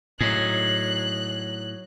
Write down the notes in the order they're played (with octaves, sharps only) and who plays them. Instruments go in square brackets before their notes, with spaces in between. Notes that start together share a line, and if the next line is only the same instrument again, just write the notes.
[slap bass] A2 [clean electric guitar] F#3 D#4 G#4 [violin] F#6